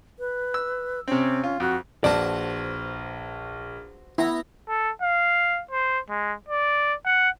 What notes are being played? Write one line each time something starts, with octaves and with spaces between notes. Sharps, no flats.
B4
E6
C3 C4 C#4
F4
F2 F#4
A#1 F#4 B4 C5 D5 A5
B3 E4 A#5
A4
F5
C5
G#3
D5
F#5